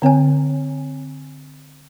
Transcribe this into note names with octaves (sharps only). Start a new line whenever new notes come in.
D3 C4 C#5 G#5